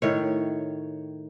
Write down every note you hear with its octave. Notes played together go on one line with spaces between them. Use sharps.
A2 D#3 C#5